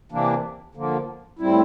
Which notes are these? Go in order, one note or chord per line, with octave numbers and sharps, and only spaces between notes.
C3 E3 A#3 D4
D3 F3 A#3
A2 G3 C4 E4